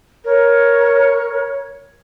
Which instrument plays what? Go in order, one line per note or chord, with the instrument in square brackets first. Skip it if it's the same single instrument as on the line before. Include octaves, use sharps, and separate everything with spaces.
[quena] A#4 [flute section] C#5